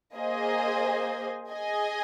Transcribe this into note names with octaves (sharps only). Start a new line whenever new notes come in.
A#3 G#4 C5 D#5 G#5
G#4 D#5 G#5